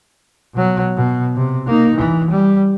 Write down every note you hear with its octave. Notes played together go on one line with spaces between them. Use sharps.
B2 F#3
B2
C3
A#3 D#4
E3
G3